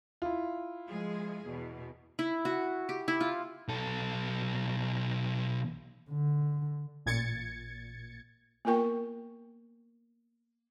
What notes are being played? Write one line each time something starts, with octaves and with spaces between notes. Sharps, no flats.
E4 F4
F3 G#3 G#4
E2 B2
E4
F#4
G4
E4
F4
B1 A4
D3
A1 A#2 G#6 A6 C#7
A#3 B3 F4 A#4 G5 C#6